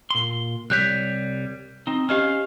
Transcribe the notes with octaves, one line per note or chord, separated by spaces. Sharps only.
A#2 C6
C2 G3 C#5 F#6 G6 B6
C4 D#4
C#4 G4 C5 D#5 F5 F6